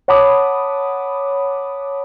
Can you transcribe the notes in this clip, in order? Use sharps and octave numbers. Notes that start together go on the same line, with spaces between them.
C#5 F#5 A5 B5 D6 D#6